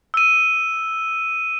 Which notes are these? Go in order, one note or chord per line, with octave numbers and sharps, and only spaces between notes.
E6 D#7